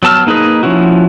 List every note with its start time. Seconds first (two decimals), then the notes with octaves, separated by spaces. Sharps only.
0.03 F#3 B3 A5 E6 F6
0.27 A#3 D#4 G#4 B4 D#5
0.63 F3 B3 C#4 E4 F#4